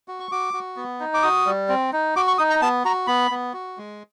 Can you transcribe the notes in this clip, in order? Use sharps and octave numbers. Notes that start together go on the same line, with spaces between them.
F#4
C#6
F#4 D6
F#4
B3
D#4
D6
F#4 D#6
G3
C4
D#4
F#4 D6
C#6
D#4 D#6
A#5
B3 A5
F#4 A#5
B3 B5
B3
F#4
G#3